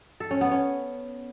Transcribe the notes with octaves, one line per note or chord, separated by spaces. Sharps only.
A4
C#4
B3
C#4